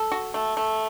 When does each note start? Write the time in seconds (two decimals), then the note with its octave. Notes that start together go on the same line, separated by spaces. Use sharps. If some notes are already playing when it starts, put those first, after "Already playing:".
Already playing: A4
0.12 F#4
0.34 A3
0.57 A3